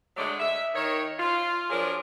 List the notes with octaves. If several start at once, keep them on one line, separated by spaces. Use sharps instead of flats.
D3 F#3 G#3 A3 D5
E5
D#3 C#5
F4
F3 F#3 D4 G#4 A#4